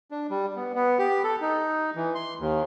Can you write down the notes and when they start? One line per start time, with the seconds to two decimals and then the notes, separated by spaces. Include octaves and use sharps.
0.11 D4
0.30 G3
0.56 B3
0.75 B3
0.99 G4
1.24 A4
1.41 D#4
1.95 E3
2.15 C6
2.39 D#2